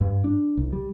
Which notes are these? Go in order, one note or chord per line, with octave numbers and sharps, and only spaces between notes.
G2
D4
C2
G3